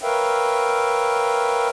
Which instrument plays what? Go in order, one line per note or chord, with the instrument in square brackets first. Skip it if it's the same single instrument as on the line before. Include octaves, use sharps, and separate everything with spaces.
[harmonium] A#4 B4 C#5 E5 F5 G5